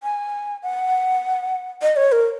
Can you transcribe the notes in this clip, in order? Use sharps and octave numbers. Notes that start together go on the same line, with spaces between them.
G#5
F#5
D#5
C#5
A#4